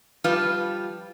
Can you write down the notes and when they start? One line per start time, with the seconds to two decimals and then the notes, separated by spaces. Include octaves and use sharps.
0.24 F3 G3 F4 B4